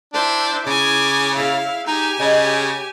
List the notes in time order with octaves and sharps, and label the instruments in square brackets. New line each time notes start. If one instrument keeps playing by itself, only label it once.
[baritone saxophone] D4 [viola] E4 C5
[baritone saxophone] C#3 [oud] E4 [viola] G#5 D6
[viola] E4 F5 [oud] G#4 C#5
[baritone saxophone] D#4 [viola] G4 G#5
[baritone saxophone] C#3 [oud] D#5